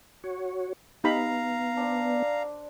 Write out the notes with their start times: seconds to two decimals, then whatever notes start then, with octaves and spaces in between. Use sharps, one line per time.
0.24 F#4 C#5
1.04 B3 D#4 G4 F5 A#5 B5
1.77 D4 C5 D5